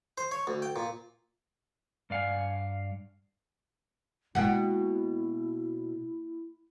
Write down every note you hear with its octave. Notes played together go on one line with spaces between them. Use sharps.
C5
C#5
D2
G5
A#2
G2 D5 F5 F#5 G#5
B2 G#3 A#3 E4 F#4 F#5 G5